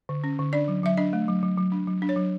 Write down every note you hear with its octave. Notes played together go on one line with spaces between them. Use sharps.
D3
C#4
D3
D4 D5
F#3
F#3 E5
D4 D#5
A3
F#3
F#3
F#3
D4
F#3
D4
C#5
F#3